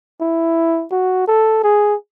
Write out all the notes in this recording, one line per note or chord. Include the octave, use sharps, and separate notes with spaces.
E4
F#4
A4
G#4